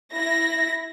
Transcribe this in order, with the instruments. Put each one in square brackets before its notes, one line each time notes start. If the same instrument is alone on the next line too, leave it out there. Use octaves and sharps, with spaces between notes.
[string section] E4 A#6